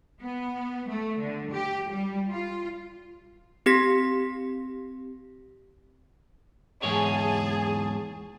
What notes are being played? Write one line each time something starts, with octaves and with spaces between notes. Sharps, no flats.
B3
A3
D3
G4
G3
F4
C4 G4 A#6 B6
E2 G#2 G#4 C#5 A5